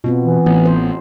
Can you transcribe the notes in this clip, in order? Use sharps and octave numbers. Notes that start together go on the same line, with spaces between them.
B2 B3 C4 F4
E3
A1 B3
C5